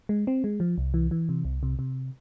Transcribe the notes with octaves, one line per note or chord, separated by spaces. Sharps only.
G#3
C4
G#3
F3
C2
E3
E3
C3
C2
C3
C3